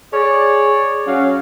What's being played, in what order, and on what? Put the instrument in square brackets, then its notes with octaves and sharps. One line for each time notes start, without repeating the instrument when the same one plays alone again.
[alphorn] G#4 [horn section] C#5 D5
[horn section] F#3 F5 [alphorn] C#4